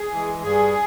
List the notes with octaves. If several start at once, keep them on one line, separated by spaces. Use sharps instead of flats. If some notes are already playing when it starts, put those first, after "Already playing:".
Already playing: G#4
E3 G#3
G2 G#4